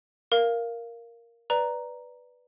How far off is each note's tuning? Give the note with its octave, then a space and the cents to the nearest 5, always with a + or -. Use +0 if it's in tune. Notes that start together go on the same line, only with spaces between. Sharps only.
A#4 +0 F5 -10
B4 +0 D5 +0 A#5 +0